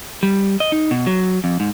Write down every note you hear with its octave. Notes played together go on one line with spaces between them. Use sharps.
G3
D#5
D#4
B2
F#3
F2
G#2